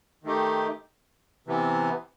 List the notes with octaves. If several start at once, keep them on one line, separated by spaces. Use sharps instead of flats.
D#3 A3 D#4 G4
C3 E3 B3